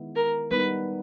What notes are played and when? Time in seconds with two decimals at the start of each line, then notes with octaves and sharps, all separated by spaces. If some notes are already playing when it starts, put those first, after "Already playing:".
Already playing: D#3 G#3 B3 E4
0.16 A#4
0.51 G3 B3 D#4 B4